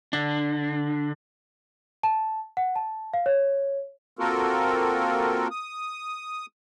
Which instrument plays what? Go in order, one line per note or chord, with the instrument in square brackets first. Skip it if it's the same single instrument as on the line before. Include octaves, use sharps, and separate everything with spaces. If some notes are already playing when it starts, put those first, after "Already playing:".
[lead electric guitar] D3 D4
[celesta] A5
F#5
A5
F5
C#5
[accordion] A#3 C4 F4 F#4 A4 A#4
D#6